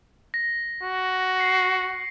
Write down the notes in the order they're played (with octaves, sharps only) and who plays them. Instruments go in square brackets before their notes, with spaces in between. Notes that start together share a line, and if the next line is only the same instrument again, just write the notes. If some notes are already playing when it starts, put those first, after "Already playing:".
[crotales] A#6
[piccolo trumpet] F#4
[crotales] C7 C#7